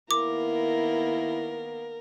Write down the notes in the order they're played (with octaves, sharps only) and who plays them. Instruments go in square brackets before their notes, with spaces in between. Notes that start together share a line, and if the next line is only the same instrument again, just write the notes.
[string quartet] D#3 A#3 B3 [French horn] E4 [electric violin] A#4 [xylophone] D6